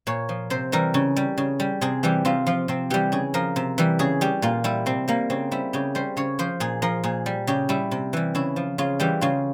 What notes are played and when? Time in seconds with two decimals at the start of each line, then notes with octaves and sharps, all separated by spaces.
0.07 A#2 C#5
0.29 F3
0.50 C3 C5
0.72 E3 G3 A#4
0.94 C#3
1.16 G3
1.38 C#3
1.60 G3
1.81 C3 G#4
2.03 E3 G3 G4
2.25 C3 F4
2.47 F3 F4
2.68 C3 C4
2.90 E3 G3 G4
3.12 C#3 G#4
3.34 F3 A#4
3.56 C3
3.78 E3 G3
3.99 C#3 G#4
4.21 G3 G4
4.42 A#2 F4
4.64 G3 E4
4.86 C3 C4
5.08 G3 A#3
5.30 C#3 C4
5.51 G3 E4
5.73 C#3 G4
5.95 G3 C5
6.17 C#3 C#5
6.39 F3 C5
6.60 A#2 G#4
6.82 F3 A#4
7.04 A#2 G#4
7.26 G3
7.47 C#3 G4
7.69 G3 E4
7.91 C3
8.13 E3 G3
8.35 C#3 E4
8.56 F3
8.78 C#3 F4
9.00 E3 G3 G4
9.21 C#3 F4